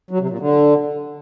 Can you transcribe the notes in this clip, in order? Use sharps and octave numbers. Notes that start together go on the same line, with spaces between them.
F#3
C3
A#2
D3